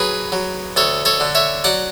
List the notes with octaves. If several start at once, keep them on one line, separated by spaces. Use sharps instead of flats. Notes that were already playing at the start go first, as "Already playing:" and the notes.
Already playing: F#3 G#4 B4
F#3
D2 A4 C#5
A4 C#5
D3
C#5 E5
F#3 D5 F#5